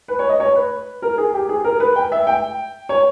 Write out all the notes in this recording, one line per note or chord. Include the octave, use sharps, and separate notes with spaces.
B4
C#5
D#5
C#5
B4
A#4
G#4
G4
G#4
A#4
B4
G5
E5
G5
C#5